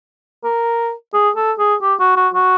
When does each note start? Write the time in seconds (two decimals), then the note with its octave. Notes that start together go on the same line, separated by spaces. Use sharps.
0.44 A#4
1.14 G#4
1.36 A4
1.59 G#4
1.82 G4
2.00 F#4
2.17 F#4
2.34 F#4